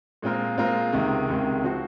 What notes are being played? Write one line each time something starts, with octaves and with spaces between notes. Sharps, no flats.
A#2 G#3 C4 F4 A#4
A#2 G#3 C4 F4 A#4
C#2 C3 D#3 G#3
C#2 C3 D#3 G#3
F3 C4 F#4